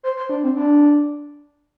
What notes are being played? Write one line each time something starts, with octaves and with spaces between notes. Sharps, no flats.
C5
C5
D4
C4
D4